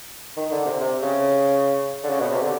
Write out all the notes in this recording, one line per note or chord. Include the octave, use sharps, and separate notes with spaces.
D#3
D3
C3
C3
C#3
D3
C#3
B2
C3
D3